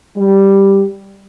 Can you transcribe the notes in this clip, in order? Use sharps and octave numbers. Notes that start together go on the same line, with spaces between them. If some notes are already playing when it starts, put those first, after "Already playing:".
G3